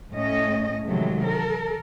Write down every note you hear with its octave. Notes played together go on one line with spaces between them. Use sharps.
A2 A3 C#4 D#5
C3 D#3 E3 F#3 G#3 A3
A4 A#4